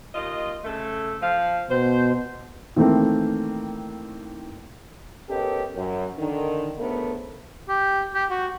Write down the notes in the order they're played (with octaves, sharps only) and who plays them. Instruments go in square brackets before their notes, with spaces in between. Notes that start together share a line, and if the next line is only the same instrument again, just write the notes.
[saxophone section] D#2 F4 D#5
C#3 A3 A4
F3 F5
[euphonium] B2 [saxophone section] C5
[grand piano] D#3 E3 A3 A#3 C4
[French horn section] B3 C#4 G4 A4 A#4 D#5
F#2
D3 D#3
D2 C#3 A3 B3 A#4 C5
[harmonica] G4
G4
F#4